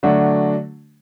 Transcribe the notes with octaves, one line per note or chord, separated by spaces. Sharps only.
D3 F#3 A3 D4 F#4